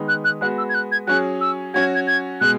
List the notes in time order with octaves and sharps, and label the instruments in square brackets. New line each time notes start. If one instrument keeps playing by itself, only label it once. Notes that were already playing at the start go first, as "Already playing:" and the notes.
Already playing: [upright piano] D#3 G#3 B3 D#4
[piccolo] F#6
F#6
[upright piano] G#3 B3 F#4 [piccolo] F#6
[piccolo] E6
G#6
F#6
G#6
[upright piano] F#3 C#4 G#4 [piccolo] F#6
[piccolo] E6
[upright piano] F#3 C#4 F#4 [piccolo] G#6
[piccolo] G#6
G#6
[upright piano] B2 G#3 [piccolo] F#6